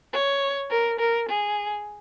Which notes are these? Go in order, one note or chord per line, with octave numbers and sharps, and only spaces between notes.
C#5
A#4
A#4
G#4